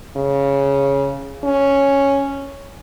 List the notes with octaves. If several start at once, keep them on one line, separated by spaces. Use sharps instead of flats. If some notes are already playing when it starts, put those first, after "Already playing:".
C#3
C#4